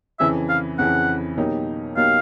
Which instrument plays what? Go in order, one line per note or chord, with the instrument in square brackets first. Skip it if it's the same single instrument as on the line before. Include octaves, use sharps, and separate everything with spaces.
[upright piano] F2 C#3 E3 [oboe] E5
[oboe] F5
[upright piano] F2 C#3 E3 [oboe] F#5
[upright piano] B2 F#3 A#3 D#4 G4
[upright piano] B2 F#3 A#3 D#4 G4 [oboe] F5